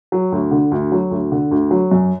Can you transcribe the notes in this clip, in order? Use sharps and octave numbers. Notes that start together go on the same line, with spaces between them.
F#3
D2
D3
D2
F#3
D2
D3
D2
F#3
F#2